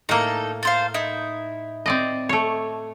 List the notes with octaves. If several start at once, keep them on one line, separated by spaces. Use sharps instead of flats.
A2 A#3 D#4 A4
A4 C5 F5
D#4 E4
C4 D5 D#5
A3 C#5